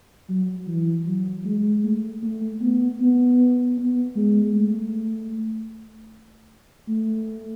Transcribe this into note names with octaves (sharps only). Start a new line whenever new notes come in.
F#3
E3
F#3
G#3
A3
A3
B3
B3
B3
G#3
A3
A3